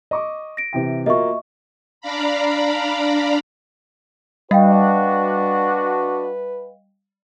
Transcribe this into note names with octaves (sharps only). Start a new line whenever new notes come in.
D#5 C#6 D6
A#6 D7
C3 E3 G5
A#3 F4 F#4 D#5 E5 C#6
D4 D5 F5 A#5 B5
G3 D4 F#4 B4 D#5 F5 G5